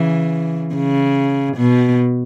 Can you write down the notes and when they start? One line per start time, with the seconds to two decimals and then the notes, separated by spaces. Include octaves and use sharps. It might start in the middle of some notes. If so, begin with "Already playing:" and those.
Already playing: C#3 E3
0.75 C#3
1.57 B2